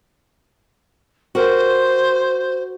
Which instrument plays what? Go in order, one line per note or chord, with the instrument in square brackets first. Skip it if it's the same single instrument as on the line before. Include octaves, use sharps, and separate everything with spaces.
[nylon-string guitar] F#4 G4 A#4 [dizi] C5